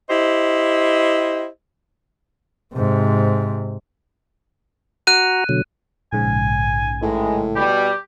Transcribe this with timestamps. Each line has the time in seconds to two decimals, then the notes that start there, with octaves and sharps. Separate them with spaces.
0.09 E4 G4 C5 D#5
2.74 G#2 C3
5.07 F#4 F#5 A#5 F#6 D#7
5.49 B2 D3 F#3
6.13 A#1 G#2 C#3 G#5
7.02 A2 D#3 E3 G#3
7.56 B2 G3 G4